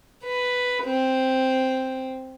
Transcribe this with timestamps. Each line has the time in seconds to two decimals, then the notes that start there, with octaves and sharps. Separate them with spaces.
0.24 B4
0.83 C4